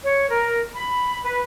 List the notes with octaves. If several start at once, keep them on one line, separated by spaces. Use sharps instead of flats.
C#5
A#4
B5
B4